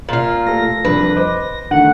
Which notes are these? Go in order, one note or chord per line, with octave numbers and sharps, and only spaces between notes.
A#2 F4 F#7
A3 A4 A#6
C2 F2 D4 B4
C5 D#5 D6
D3 D#3 A3 F#5